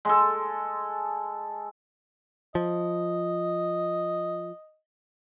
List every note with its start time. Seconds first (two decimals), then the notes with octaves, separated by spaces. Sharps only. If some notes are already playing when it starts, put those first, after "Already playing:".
0.05 G#3 A4
2.55 F3 D#5